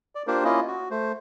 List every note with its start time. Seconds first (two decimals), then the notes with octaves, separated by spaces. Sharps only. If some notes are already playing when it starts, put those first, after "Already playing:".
0.15 D5
0.27 A#3 D4 F4 G4 A#4 C5
0.44 A#3 C#4 E4 F4 D#5
0.67 F#4
0.91 A3 C5